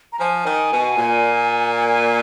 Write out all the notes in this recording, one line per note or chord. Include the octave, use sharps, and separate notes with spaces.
A#5
F3 G#5
D#3
B2
A#2
G#5